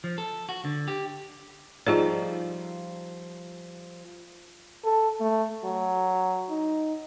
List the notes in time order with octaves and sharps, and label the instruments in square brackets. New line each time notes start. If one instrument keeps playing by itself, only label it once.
[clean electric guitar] F3
A4
F#4
D3
G4
[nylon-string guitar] F3 G3 D#4 [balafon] F4 G#4 D5
[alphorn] A4
A3
F#3
D#4